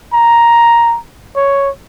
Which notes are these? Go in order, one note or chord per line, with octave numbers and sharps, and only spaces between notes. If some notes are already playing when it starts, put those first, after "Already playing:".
A#5
C#5